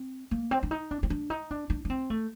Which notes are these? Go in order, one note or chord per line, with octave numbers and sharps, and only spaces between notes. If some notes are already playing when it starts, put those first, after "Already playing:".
Already playing: C4
A#3
C4
D4
D#4
D4
C4
D4
D#4
D4
D4
D4
C4
A3